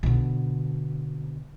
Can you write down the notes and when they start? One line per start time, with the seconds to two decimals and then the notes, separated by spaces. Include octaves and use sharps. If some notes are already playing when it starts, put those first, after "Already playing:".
0.03 B2 D3